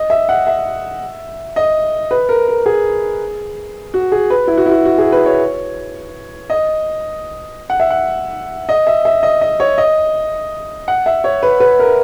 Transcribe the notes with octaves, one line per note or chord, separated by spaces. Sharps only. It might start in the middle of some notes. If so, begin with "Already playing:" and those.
Already playing: D#5
E5
F#5
E5
D#5
B4
A#4
A#4
G#4
F#4
G#4
B4
E4
F#4
E4
F#4
F#4
G#4
B4
C#5
D#5
F#5
E5
F#5
D#5
E5
E5
D#5
D#5
C#5
D#5
F#5
E5
C#5
B4
B4
A#4